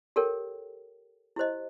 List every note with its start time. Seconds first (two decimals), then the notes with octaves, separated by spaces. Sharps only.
0.16 G4 A4 A#4 C#5 G5
1.36 E4 G4 C5 D#5